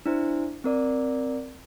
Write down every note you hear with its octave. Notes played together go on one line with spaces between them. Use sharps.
D4 E4 C5
C4 A#4 D5